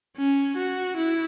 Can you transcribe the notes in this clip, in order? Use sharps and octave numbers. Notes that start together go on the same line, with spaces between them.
C#4
F#4
E4